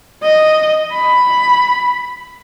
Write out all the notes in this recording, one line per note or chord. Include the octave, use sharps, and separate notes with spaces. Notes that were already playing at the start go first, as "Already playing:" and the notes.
D#5
B5